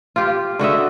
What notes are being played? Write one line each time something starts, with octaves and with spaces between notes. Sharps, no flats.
F4 G4
D3 F#4 D#5 E5